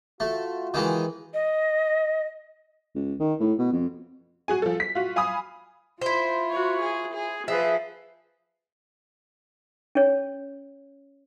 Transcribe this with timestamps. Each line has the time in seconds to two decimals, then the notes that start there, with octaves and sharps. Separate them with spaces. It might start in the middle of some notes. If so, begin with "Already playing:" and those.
0.20 A3 F4 F#4
0.74 D#3 E3 G#3
1.34 D#5
2.95 C#2
3.20 D#3
3.40 A2
3.58 B2
3.73 F2
4.48 F#4 G#4 G#5
4.62 F3 A4
4.80 B6
4.95 F4 F#4
5.16 F5 G#5 B5 D#6
6.01 E4 F4 C5
6.50 F#4 C#5
6.81 G#4
7.14 G#4
7.48 F3 G#4 B4 C5 E5
9.95 C#4 C#5